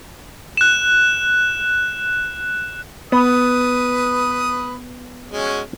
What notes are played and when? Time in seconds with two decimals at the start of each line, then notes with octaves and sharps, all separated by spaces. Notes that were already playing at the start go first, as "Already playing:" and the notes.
0.57 F#6 E7
3.12 B3 B4 D#6
5.31 G#3 C#4 F#4